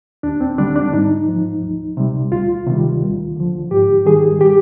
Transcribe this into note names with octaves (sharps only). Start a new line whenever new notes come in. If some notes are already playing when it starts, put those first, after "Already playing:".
D#2 D4
C4
D3 G3 D4
D4
G#2 D#4
F3
D2
C3 G3
D2 F4
C3 D#3 G3
D2
D3 F3
G#2 G4
D#3 G3 G#4
G4